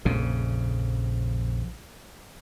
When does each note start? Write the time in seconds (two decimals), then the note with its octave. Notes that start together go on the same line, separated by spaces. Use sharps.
0.05 A#1 F2 C#3